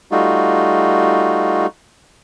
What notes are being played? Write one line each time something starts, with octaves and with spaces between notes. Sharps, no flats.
G3 A3 D#4 F4 F#4